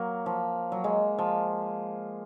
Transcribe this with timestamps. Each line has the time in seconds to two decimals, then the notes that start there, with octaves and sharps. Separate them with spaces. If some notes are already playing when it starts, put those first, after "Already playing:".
Already playing: F#3 A#3
0.26 F3
0.72 F#3
0.84 G#3
1.18 F3